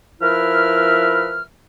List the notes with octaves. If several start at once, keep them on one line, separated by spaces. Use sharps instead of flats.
F3 E4 A#4 B4 E5 F6